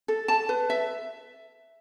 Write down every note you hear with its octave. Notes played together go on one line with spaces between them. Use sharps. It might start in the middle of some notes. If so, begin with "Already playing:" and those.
A4
A5
B4
E5